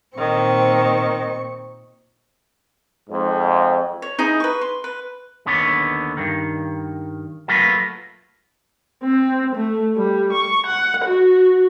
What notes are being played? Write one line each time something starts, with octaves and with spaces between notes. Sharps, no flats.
A#2 D#3 C4 C#6
F2 G#2
C#5
D#4 E4 G#4 D#5
B4 C#6
C6
B4
D#2 D3 B3 C#5
G2 D#3
F#3 A3 A#3 F4 B4
C4
A3
G3
C#6
F#5
F#4